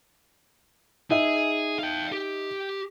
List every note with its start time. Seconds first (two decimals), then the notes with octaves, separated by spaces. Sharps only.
1.10 D#4 G#4 E5
1.79 F5 G5
2.12 G4